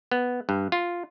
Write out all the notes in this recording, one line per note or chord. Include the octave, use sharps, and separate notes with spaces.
B3
G2
F4